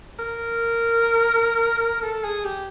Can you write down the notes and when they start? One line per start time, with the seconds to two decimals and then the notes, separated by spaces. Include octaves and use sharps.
0.19 A#4
2.03 A4
2.24 G#4
2.45 G4